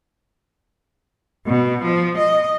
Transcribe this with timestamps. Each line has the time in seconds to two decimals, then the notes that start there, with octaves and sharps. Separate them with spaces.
1.47 B2
1.84 F3
2.18 D#5